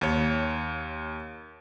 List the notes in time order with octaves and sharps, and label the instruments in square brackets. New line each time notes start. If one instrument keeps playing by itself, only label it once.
[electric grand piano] D#2 C#5